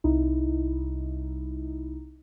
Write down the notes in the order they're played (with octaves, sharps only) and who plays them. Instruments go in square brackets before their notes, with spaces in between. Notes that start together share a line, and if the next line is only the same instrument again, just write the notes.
[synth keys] C2 D#4 E4